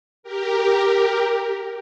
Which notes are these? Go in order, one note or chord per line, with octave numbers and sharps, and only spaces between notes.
G4 A#4